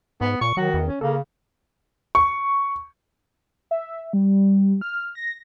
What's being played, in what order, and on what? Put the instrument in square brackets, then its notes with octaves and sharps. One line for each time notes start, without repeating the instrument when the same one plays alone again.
[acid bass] G#2 [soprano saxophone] B3
[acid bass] A#2 [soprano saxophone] C#6
[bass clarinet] D#3 [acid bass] F#3 [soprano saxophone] F#4
[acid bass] E2
[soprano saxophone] C#4
[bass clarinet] C#3 [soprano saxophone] A#3 [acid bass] A4
[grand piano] C#6
[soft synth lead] E5
G3
F6
A#6